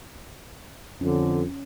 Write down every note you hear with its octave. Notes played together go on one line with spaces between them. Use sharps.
F2 D3 C#4